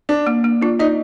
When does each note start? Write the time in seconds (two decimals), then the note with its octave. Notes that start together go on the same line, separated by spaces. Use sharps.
0.09 D4 D5
0.27 A#3
0.44 A#3
0.61 D4 F4
0.79 D#4 D5